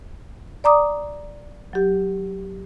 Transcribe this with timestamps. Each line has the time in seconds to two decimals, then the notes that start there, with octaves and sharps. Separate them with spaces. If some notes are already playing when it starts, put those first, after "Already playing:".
0.64 D5 A#5 D6 D#6
1.73 F#3 G4